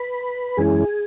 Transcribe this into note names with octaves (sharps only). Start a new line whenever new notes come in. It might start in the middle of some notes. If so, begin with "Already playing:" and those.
Already playing: B4 B5
F#2 E3 G#3 C#4 E4 G#4 G#5